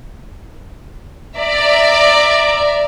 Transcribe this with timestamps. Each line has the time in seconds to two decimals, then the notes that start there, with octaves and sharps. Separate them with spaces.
1.37 D5 E5 A#5